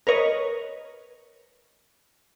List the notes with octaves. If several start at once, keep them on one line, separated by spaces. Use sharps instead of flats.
A#4 B4 C#5 D#5